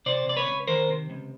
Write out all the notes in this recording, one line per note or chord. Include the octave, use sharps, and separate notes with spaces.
C3 C5 D5
C3 D5
B4 C#5
C#2
D#3 A#4 C5
C3
C#2